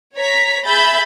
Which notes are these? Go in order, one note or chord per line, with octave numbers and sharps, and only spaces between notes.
C#5 A#5 B6
G#4 E5 B5 G6 A6